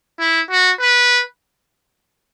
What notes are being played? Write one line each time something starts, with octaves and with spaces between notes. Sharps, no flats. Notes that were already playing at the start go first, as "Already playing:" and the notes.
E4
F#4
B4